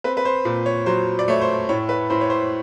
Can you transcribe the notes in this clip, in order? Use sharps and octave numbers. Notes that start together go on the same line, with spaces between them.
C4 B4
B4
C5
A#2
C#5
F#3 C5
D5
A3 C#5
C5
A2 C#5
B4
A2 C5
C#5
C5